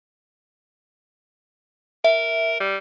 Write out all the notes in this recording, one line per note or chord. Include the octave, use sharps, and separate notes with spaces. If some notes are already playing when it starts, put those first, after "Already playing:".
A#4 E5
G3